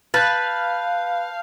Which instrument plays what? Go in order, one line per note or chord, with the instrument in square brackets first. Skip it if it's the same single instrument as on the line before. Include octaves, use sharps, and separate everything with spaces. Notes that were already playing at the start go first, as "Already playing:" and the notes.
[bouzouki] B4 [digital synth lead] F5 [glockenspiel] A5 G6 [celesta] A6